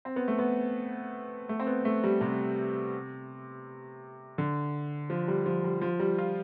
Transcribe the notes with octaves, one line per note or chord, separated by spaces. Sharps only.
C4
B3
A3
B3
A3
C4
B3
A3
G3
C3
D3
F3
G3
F3
G3
F3
G3
F4